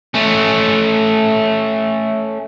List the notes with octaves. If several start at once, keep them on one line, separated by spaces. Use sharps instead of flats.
A3 C#4